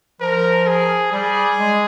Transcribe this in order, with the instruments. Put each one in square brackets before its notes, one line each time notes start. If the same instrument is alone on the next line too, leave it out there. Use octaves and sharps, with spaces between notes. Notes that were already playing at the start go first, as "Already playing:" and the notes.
[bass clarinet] F3 [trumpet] A#4
[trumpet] G#4
[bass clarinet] G3 [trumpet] G#4
[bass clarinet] G#3